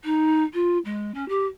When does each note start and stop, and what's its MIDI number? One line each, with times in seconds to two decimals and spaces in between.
0.04 0.43 63
0.53 0.78 65
0.85 1.11 56
1.14 1.27 61
1.28 1.45 67